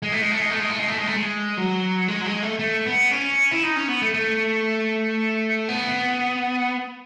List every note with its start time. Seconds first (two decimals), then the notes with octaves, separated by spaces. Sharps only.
0.03 G#3
0.12 A3
0.22 G#3
0.31 A3
0.41 G#3
0.50 A3
0.59 G#3
0.69 A3
0.79 G#3
0.88 A3
0.97 G#3
1.07 A3
1.16 G#3
1.57 F#3
2.08 G#3
2.21 F#3
2.26 G#3
2.42 A3
2.59 A3
2.86 B3
3.11 C#4
3.51 E4
3.63 D#4
3.76 C#4
3.88 B3
4.02 A3
4.14 A3
5.69 B3